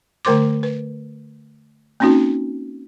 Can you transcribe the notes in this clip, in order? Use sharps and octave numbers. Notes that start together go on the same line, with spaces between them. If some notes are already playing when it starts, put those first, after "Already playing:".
D3 A3 A#4 C5 C6 D6
B4
A#3 C4 C#4 D#4 F#4